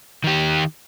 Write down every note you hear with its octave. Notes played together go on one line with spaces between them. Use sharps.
D#3 G4